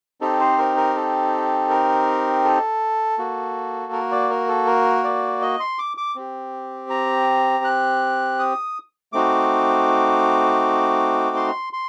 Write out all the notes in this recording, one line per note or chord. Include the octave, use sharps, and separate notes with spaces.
C4 D#4 G4 A4
C5
A#4
A#4
A4
A#4
A4
A#3 F#4
A#4
D5
A#4
A4
A#4
D5
D#5
C6
D6
D6
C4 G4
A#5
F#6
D#6
A3 C4 D#4 F#4 D6
C6
C6